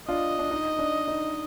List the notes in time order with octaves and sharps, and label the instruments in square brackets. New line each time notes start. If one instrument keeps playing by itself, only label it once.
[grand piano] D4 F4 [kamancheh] D#5
[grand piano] D4
D#4
D4
D#4